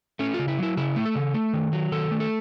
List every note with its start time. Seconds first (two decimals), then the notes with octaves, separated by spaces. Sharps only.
0.19 A3 C#4
0.34 C#3 F4
0.48 E4
0.58 F#3 E4
0.77 C#3 E4
0.96 A3
1.05 A4
1.15 C#3
1.34 A3
1.53 D#3
1.73 F#3
1.92 D#3 A4
2.11 A3
2.20 A4